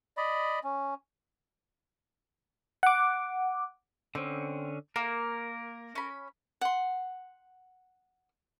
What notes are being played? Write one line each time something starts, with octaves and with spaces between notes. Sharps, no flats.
D5 D#5 B5
C#4
F#5 D6
D3 C4 C#4
A#3 A#4
C#4 B5
F#5 C6